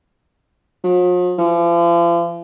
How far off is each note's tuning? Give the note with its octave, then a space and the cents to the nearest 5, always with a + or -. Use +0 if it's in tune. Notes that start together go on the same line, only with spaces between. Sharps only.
F3 +45
F3 -40